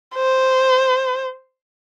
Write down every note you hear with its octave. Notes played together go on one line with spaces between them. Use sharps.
C5